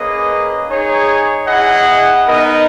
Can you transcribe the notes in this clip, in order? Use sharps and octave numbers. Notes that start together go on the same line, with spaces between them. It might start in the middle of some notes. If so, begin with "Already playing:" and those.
Already playing: A#3 C#4 G#4 B4 D#5
D#4 G#4 C#5
E4 G#4 D#5 F#5
B3 D#4 A#4 D#5